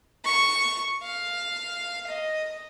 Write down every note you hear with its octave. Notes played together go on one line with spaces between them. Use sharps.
C#6
F5
D#5